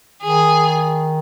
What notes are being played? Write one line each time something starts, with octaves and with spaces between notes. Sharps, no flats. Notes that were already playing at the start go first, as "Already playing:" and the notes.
D#3 G#4